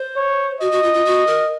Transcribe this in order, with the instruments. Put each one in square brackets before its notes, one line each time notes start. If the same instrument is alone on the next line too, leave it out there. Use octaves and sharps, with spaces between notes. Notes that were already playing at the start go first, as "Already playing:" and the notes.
Already playing: [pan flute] C5
[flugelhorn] C#5
[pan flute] F#4 [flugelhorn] D#5
[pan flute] F#4
F4
F4
F#4
A#4